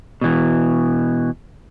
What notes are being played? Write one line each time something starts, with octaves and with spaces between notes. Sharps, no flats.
B2 E3